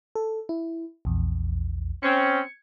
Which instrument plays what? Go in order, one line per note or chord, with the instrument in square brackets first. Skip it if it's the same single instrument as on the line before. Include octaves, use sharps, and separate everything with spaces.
[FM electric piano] A4
E4
A#1 E2
[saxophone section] C4 C#4 [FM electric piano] G#6 C#7